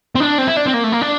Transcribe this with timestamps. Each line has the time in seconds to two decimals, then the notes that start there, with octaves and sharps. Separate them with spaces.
0.15 C4
0.20 D4
0.38 C4
0.48 E4
0.57 D4
0.66 C4
0.74 A#3
0.84 A3
0.92 A#3
1.01 D4